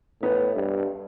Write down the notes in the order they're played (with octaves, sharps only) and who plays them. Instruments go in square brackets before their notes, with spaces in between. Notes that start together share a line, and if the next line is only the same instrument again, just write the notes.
[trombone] A2 [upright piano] B3
[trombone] G2